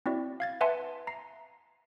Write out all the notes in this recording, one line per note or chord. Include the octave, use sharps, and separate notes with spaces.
C4 E4 F#4 D5
F5 G#6 A6
B4 E5 F#5 G#5 A5 C6
A#5 C7